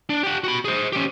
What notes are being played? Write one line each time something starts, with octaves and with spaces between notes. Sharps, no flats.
D4
G4 F#5
F#4 B5
G#4 C5
C#4 G4